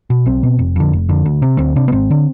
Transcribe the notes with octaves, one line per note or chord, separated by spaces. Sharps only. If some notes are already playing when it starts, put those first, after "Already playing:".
B2
B1 C4
B2
F1
F2 D3
F1
F2 D3
D2
C3
D2 C4
C3 D4
B3
G#1 C4
D3